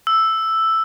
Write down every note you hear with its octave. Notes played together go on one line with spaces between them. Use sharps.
E6